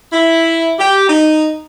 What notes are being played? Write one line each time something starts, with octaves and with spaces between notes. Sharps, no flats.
E4
G4
D#4